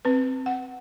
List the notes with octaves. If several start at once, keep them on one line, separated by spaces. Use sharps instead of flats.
C4 B4
F#5